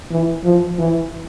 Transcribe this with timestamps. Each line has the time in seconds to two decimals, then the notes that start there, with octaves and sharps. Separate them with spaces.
0.11 E3
0.44 F3
0.78 E3